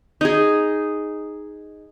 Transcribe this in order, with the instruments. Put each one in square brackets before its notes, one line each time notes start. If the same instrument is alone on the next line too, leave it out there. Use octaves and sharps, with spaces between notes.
[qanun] D#4 G#4